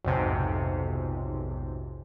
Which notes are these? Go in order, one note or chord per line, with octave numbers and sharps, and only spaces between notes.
B1 F2 G#2 C3